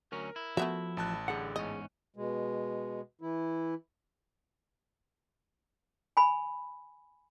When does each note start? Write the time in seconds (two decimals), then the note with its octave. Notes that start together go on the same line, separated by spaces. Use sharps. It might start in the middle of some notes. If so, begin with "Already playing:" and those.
0.12 D2 F#3 C#4 A#4
0.36 E4
0.57 F3 A3 B3 F#4 E5
0.97 A1 A5 F#6
1.28 D3 G3 G#4 F#5
1.56 E2 G#2 C#4 D#5
2.16 B2 G#3
3.21 E3 E4
6.17 G#5 B5